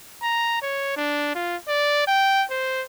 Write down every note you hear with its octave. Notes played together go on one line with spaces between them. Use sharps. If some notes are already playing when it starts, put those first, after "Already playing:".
A#5
C#5
D4
F4
D5
G5
C5